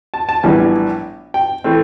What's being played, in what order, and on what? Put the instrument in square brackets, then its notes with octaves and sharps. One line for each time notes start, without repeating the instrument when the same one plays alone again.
[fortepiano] A5
A5
A#1 A2 E3 G3 B3 G#5
G5
E3 A3 C4